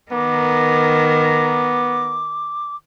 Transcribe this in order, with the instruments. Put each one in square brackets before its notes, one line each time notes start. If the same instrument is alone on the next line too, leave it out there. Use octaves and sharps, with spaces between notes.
[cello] D#3 A#4 [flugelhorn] B3 [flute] D6